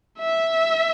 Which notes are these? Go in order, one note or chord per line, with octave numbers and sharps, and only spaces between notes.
E5